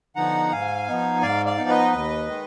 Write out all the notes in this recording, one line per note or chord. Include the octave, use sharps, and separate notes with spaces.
D3 F3 B3 D#4 F#5 A#5
G#2 F5 G#5
F3 B3 D#4
G#2 D5 F5
D5 F5
F3 B3 D#4
B4 D#5
D#2
D#3 G#3